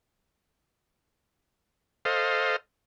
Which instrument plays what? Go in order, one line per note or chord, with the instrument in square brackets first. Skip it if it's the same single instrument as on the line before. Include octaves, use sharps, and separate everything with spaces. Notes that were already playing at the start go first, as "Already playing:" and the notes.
[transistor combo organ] A4 C5 D#5 F5